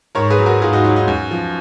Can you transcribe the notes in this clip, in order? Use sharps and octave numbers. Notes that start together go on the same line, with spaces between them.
G#2 A#4 C#5
G#4 B4
F#3
F#4 A#4
G#2 F4 G#4
D#4 F#4
F#3 F4
D#4
F#2
F3